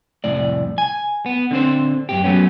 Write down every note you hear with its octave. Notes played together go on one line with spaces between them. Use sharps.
C2 F2 A2 D5
G#5
B3
D3 C4 C5
F#2 A#2 G4
F#3 A3 B3 C#4